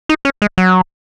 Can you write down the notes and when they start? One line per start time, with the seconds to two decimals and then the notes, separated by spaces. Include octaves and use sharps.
0.09 D#4
0.25 C#4
0.42 G#3
0.58 F#3